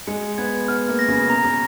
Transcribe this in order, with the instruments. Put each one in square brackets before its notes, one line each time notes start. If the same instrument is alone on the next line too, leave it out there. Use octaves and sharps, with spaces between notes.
[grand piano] G#3 [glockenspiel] C#7
[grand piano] B3 [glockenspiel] G#6
[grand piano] B3 [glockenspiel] F6
[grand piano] A#3
[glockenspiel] A#6
[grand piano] C#3
[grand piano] B2 [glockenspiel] A#5
[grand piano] C#3